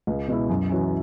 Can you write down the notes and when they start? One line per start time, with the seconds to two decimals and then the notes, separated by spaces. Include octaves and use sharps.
0.07 C#2
0.28 B2 G#3 E4
0.49 F#2
0.70 E3 C#4 F#4